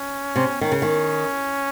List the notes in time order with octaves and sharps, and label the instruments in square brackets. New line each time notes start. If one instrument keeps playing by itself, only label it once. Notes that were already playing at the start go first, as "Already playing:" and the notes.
Already playing: [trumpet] C#4
[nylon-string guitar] C3
[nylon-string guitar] D#3 [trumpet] C#4
[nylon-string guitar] C#3
D#3